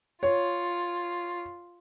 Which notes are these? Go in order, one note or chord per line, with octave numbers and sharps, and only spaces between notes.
F4 C#5